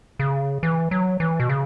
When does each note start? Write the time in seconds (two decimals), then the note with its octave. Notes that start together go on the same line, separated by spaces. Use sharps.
0.19 C#3
0.63 E3
0.91 F#3
1.20 E3
1.40 B2
1.49 C#3